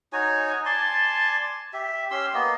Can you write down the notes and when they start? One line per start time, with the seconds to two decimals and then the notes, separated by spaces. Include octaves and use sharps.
0.13 D#4 F#4 C#5 G#5
0.65 D5 G#5 A5 C6
1.73 G4 E5
2.11 C#4 G4 C6 E6
2.34 A#3 B3 D#5